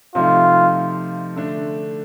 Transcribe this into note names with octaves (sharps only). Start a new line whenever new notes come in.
C3 F3 A3 D#4 F4
D3 A3 D4